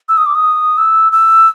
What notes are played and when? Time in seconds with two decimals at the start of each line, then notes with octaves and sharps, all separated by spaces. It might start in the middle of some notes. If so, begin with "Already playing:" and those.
0.09 E6
0.17 D#6
0.26 D6
0.35 D#6
0.78 E6
1.12 E6